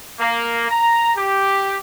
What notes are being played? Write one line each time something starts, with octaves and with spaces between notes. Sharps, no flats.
A#3
A#5
G4